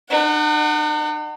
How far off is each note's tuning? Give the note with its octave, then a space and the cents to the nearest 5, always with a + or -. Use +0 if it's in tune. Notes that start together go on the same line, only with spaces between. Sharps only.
D#4 -45 F#5 +5